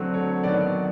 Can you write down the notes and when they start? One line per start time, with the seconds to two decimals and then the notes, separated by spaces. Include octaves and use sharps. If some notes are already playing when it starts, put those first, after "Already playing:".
Already playing: D3 F#3 A3 C4
0.14 C#5
0.43 D#3 F#3 B3 D5